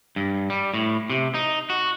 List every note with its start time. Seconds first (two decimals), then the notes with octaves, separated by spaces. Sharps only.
0.16 G2
0.50 G3
0.74 A2
1.10 C3
1.34 D#4
1.70 F#4